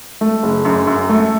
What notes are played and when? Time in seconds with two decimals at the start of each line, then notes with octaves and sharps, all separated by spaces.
0.21 A3
0.43 F#1
0.65 F#2
0.87 F#2
1.10 A3